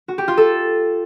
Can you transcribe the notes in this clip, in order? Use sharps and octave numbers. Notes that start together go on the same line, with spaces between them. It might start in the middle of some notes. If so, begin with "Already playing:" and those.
F#4
G4
F4
A4